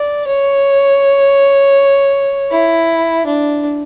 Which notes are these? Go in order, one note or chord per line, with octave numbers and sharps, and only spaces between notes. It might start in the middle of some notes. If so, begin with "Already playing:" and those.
Already playing: D5
C#5
E4
D4